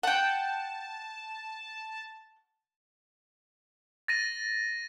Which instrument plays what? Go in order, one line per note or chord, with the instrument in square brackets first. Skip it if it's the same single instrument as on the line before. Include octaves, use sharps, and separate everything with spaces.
[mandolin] F#5 G5 [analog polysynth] A5
[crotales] A6 A#6 D#7